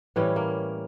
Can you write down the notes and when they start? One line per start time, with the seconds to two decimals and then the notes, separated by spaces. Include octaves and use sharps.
0.16 A2 E3 G3 C#4
0.36 A#3